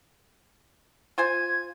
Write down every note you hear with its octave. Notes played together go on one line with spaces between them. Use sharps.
F4 C5 G#5 G#6